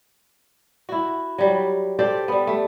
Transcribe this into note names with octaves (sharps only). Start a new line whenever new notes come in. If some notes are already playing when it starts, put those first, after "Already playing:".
E4 F#4
F#3 G3
G4 A4 C5 D5
G3 B3
A3